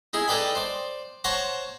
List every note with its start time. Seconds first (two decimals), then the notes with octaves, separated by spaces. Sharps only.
0.13 D#4 E4 G#4
0.28 D#4 A4 B4 D5 G5 B5
0.55 C5 D5
1.24 C5 C#5 F#5 A5 A#5 C#6